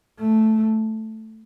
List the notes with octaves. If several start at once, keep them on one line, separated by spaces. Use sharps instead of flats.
A3